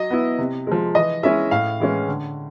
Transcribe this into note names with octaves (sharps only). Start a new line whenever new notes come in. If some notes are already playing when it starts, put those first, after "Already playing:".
Already playing: F#3 D#5
B3 E4
C3
F3 G#3
E3 D#5
G#3 C#4 E4 E5
A2 F5
E3 G#3 C#4
D3